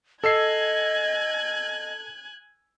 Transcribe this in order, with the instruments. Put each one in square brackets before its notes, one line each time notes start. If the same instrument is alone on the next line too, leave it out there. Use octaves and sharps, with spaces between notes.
[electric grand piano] A4 E6 C7 [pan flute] D#5 [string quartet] G#5 F#6 G#6